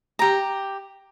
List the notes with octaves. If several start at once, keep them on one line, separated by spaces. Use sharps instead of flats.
G4 A#5